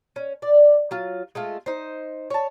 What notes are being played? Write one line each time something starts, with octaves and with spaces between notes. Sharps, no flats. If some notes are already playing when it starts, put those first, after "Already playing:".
C#4
D5
F#3 F4
G#3 A3 F4
D#4 C5
C#5 A5